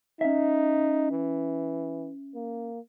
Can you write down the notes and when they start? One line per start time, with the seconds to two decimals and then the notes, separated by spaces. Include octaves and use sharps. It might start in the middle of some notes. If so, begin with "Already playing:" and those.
0.21 C#4 D#4 E5
1.11 E3
2.35 A#3